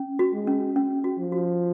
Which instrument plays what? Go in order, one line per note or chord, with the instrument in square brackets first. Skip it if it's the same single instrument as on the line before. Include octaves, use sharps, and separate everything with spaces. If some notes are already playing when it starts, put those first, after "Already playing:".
Already playing: [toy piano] C#4
F#4
[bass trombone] G#3
[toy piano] C#4
C#4
F#4
[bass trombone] F3
[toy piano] F#4